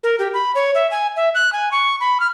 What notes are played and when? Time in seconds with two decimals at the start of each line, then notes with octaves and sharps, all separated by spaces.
0.03 A#4
0.19 G4
0.34 B5
0.55 C#5
0.75 E5
0.91 G#5
1.16 E5
1.35 F#6
1.53 G#5
1.72 C#6
2.00 B5
2.20 F6